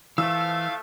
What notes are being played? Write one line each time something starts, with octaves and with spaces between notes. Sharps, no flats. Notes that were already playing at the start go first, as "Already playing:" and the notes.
E3 F3 A3 F5 E6